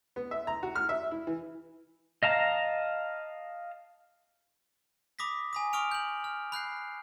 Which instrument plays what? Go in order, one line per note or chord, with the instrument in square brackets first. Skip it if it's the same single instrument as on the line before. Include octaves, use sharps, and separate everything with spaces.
[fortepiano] B3
E5
A#5
F#4
F6
E5
E4
E3
[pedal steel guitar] D#5 F5 A5 A#5
[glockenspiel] B5 D6 D#6 A#6 B6
G#5 B5 D#6
C#6 D#6 F6 D7 F7
G6 F#7
F6
B5 F#6 G6 C7